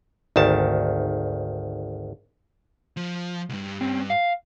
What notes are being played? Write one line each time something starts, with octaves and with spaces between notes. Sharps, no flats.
G#1 D2 D#3 A5
F3
C2 G2
C4 C#4
F5